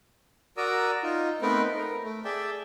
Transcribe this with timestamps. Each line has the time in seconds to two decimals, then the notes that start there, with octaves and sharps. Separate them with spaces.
0.57 F#4 A#4 D5 A#5 D#6 E6
1.03 D#4 F4
1.42 A3 B3 C4 D#4 A#4 B4
1.75 A#4
2.04 A3
2.25 G#4 D5 E5 G5 A5